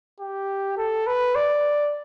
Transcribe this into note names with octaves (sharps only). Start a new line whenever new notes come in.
G4
A4
B4
D5